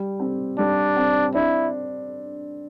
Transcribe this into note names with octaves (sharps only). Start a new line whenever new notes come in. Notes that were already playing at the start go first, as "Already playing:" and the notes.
Already playing: G3
C4
G3 D4
C4
D4 E4